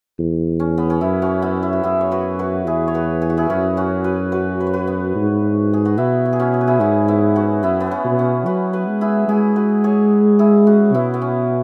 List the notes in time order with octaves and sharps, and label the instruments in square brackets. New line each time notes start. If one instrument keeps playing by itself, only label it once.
[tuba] E2
[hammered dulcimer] C#4
B3
C#4
[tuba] F#2 [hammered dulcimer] B3 E4
[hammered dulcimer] C#4 F#4
B3 E4
E4
F#4
[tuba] F#2 [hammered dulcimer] E4 G#4
[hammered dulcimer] C#5
F#4 B4
F#4 B4
[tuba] E2 [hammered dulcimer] E4 G#4
[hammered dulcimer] C#5
F#4 B4
G#4
F#4
E4 G#4
[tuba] F#2 [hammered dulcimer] C#4 F#4
[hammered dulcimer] C#4 F#4
F#4 B4
F#4 B4
B4
C#5
F#4 B4
B3
[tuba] G#2
[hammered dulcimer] G#4
F#4
[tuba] B2 [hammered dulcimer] B3 E4
[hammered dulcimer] F#4
G#4
C#4 F#4
G#4
B4
E4 G#4
[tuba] G#2 [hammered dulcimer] C#4 F#4
[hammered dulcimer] B3 E4
C#4 F#4
[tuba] F#2 [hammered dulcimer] B3 E4
[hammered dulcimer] B3
C#4
[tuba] B2
[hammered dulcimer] C#4
[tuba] F#3 [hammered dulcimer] F#4 B4
[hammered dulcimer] F#4 B4
[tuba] G#3
[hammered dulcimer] E4 G#4
[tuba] G#3 [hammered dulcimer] E4 G#4
[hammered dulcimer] F#4 B4
G#4 C#5
E4 G#4
C#4 F#4
[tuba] B2 [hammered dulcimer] B3 E4
[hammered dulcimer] B3
C#4